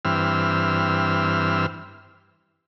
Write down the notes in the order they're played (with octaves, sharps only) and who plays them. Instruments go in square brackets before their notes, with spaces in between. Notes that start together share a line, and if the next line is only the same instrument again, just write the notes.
[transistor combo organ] G2 E3 C4 E6 F6